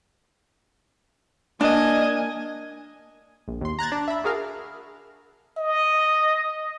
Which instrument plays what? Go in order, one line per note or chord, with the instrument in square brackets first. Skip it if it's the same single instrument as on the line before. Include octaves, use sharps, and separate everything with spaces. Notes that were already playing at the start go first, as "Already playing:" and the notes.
[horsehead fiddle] A#3 G#5 [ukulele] D4 [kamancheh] D#5
[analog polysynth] A#1
D#2 C6
A#5 F#6 G#6 A6
D4
E5 B5
F#4 G#4 A#4 F5
[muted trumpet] D#5